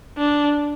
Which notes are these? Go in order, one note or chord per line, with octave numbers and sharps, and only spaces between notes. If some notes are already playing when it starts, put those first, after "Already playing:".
D4